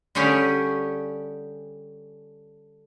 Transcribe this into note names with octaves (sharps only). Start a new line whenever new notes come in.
D3 G3 C#4 G4 G#4 C#5